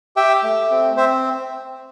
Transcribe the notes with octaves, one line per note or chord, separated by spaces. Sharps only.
G4 E5 G5
A3
C4
C4 C5 E5